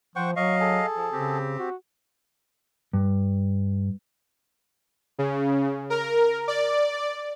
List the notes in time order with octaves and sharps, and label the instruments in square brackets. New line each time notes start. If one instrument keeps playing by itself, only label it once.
[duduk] F3 [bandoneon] C5 C#6 [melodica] F#5 G5
[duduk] F#3 [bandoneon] D#5 F5 [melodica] C#6
[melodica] G#4 A4
[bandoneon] F3
[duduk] C#3 [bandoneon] C4 G4
[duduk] F#4
[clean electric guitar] G2
[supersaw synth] C#3
A#4
D5